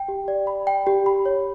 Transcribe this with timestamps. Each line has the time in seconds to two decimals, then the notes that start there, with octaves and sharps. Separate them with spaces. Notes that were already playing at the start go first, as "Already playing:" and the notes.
Already playing: G5
0.08 G4
0.28 D5
0.47 B5
0.67 G5
0.87 G4
1.06 B5
1.26 C#5